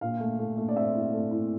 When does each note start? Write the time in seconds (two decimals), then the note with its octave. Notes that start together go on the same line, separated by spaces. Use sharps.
0.01 A#2 F5
0.20 A3
0.39 A3
0.58 A3
0.69 D5
0.76 C4 E5
0.94 E4
1.13 A3
1.31 E4